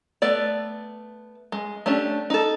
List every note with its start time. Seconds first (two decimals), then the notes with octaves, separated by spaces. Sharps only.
0.22 A3 B3 D5
1.52 G#3
1.86 A3 C#4 D4 G4
2.30 D#4 A4